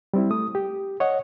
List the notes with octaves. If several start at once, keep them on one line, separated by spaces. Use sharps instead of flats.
G3 C4 E4
A3 D#6
G4
C#5 D#5 F#5